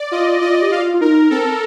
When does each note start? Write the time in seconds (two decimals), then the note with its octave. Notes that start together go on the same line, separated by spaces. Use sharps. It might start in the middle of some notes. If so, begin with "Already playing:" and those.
Already playing: D5
0.11 F4 D#5
0.41 F4 D#5
0.62 G4
0.71 F4 F5
0.94 F4
1.01 D#4 A#4
1.30 C4 A4